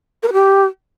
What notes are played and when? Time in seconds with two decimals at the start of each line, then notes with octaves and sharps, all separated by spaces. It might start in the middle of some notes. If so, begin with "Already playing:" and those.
0.23 A#4
0.28 B4
0.33 G4